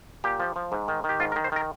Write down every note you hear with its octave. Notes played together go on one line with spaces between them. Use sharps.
A#2 G4
F3
F3
G#2
D#3
D#3
G4
G#2 F4
A#4
D#3
C5
D#3 A#4